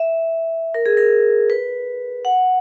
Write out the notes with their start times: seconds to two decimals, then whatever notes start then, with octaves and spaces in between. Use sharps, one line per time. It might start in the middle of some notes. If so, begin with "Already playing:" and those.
Already playing: E5
0.74 A#4
0.86 G#4
0.97 A#4
1.50 B4
2.25 F#5